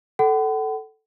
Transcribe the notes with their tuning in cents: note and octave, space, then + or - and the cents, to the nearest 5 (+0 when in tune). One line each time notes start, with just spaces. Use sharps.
A4 +0 F#5 +40 B5 +40